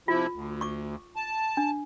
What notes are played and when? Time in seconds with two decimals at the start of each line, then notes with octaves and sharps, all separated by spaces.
0.08 C3 F3 E4 F4
0.33 D2
0.61 C#6 D6
1.16 A5
1.57 D4